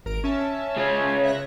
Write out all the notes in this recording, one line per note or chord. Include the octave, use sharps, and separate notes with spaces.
G#1 A#4 D7
C#4 E5 A5
C#3 F4 C#5
E5 F#6 A#6